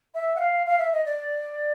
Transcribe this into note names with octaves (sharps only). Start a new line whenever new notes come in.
E5
F#5
F5
F5
E5
D#5
D5